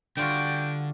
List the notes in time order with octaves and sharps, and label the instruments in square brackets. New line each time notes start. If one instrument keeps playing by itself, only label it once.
[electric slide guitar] D3 [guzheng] G3 F4 F#4 [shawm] G5 [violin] D7